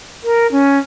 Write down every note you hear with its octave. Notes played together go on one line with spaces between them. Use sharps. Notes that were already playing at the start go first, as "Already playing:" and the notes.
A#4
C#4